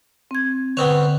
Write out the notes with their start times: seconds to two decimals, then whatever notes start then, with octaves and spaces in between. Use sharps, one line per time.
0.31 C4 G#6
0.77 D3 B3 C4 C#5